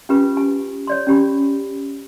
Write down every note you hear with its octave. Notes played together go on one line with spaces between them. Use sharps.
C#4 F4 G4 A#4 B4
G4 G#5
C#5 D5 C6
C#4 G4 B5